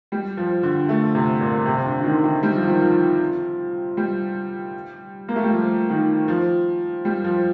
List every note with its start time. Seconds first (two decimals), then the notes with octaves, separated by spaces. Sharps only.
0.12 G3
0.37 F3
0.63 D3
0.89 A3
1.15 C3
1.40 A#2
1.66 C3
1.77 C3
1.85 D3
1.99 D3
2.04 D#3
2.24 D#3
2.43 G3
2.56 F3
2.68 D#3
2.81 F3
3.97 G3
5.28 A#3
5.36 A3
5.43 G3
5.51 F3
5.89 D#3
6.28 F3
7.05 G3
7.24 F3